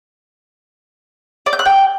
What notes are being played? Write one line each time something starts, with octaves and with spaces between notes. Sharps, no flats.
D5
G6
F#6
G5